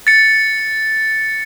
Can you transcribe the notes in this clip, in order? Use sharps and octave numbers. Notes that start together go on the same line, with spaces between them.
A6 C#7